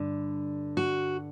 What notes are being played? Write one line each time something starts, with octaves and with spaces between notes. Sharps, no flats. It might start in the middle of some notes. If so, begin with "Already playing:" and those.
Already playing: G2 D3
F#4